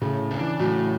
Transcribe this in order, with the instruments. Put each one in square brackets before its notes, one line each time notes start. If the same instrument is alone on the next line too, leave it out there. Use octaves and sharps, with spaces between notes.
[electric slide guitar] A2 [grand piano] C#3
[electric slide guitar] D4
[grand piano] E3
[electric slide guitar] A2 [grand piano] F#3